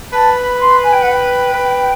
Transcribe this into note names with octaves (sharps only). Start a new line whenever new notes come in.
B4 A5
B5
C6
G#5
G5
F#5
G5
B4